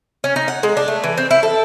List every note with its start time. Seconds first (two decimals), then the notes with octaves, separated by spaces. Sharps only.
0.24 C#4
0.36 D#4
0.48 F#5
0.63 G#3
0.77 D4
0.88 A3
1.04 E3
1.18 C4
1.31 E4
1.43 A4